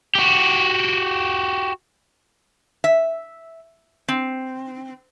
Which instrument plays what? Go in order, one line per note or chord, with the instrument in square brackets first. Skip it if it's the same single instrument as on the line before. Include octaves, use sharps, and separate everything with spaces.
[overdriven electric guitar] F#4 G4
[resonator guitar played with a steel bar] E5
C4